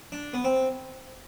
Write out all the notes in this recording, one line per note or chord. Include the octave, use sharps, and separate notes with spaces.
D4
B3
C4